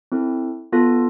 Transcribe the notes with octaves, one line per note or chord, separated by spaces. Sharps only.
C4 E4 A4
B3 F4 A4